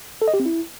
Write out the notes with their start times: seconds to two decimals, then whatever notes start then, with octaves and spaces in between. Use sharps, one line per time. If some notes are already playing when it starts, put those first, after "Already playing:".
0.22 A4
0.28 D#5
0.34 G4
0.40 C4
0.46 E4